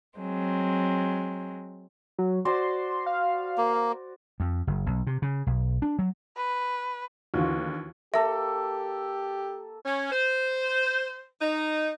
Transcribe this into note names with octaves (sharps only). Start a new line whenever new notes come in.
F#3 G#3 C4
F#3
F#4 C5 D5 C6
F5
A#3
F2
F#1
B1
C3
C#3
B1
D4
F#3
B4
D#2 D3 E3 F4 F#4
A#3 G4 A4 E5
C#4
C5
D#4